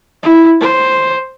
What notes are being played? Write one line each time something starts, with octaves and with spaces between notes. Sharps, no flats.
E4
C5